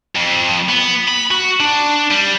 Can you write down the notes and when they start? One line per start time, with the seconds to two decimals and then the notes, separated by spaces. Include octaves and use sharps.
0.16 F2
0.69 B3
1.08 B5
1.31 F#4
1.60 D4
2.11 G3